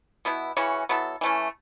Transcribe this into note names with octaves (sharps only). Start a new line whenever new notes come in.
B2 B3 E4
C#3 E3 C#4 F#4
F#3 B3 E4 A4
E3 A3 C#4